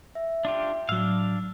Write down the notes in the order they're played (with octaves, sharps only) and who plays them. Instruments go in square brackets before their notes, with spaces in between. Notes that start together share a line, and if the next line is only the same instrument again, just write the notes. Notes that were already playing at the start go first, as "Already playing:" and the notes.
[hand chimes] E5
[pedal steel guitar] D4 F4 G4
[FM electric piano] A2 F#3 [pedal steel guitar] D4 F5 [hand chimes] E6